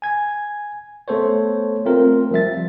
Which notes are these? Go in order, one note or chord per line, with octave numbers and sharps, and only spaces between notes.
G#5 G#6
A3 B3 A4 C5 C#5
A3 C4 F4 A#4
F3 G3 E5 A6